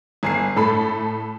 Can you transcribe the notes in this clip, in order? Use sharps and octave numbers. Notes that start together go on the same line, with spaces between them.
G1 G#5 C7
A2 A3 A4 B5